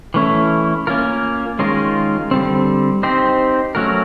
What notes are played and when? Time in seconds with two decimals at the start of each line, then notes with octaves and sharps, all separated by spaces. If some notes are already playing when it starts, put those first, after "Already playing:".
0.14 E3 A3 C#4 E4
0.87 A#3 C#4 F4 A#4
1.59 D#3 G#3 C#4 F4 A#4
2.31 D3 G3 C4
3.03 C4 D#4 G4 C5
3.75 F#3 A3 C#4 F#4 A#4